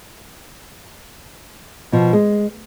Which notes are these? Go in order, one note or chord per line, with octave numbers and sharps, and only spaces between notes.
B2 F3
G#3